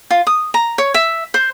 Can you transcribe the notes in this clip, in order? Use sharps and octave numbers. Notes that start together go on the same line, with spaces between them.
F4
D#6
A#5
C#5
E5
C5